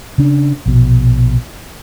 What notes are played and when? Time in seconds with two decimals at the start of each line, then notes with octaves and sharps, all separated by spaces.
0.18 C#3 D4
0.66 A#1 B2